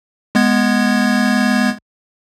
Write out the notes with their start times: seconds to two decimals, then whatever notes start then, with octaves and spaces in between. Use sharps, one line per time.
0.35 G#3 B3 G#6